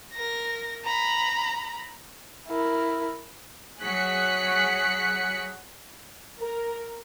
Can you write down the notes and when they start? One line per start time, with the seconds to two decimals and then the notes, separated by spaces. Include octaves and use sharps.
0.13 A#4 A#6
0.84 A#5 B5
2.47 E4 A#4
3.81 F#3 G#4 F#6 B6 C#7
6.40 A#4